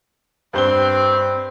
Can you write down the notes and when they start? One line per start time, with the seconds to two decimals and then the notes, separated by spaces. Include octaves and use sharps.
0.54 G2 C4 C5 G7